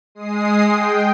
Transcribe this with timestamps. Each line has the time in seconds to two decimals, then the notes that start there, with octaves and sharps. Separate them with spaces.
0.15 G#3 D#6 C7
0.68 G5